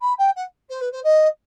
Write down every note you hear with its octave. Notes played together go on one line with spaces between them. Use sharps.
B5
G5
F#5
C5
B4
C5
D#5